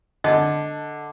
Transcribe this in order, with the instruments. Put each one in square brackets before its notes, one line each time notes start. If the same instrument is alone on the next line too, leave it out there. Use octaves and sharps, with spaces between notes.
[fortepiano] D3 [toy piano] D#5 A5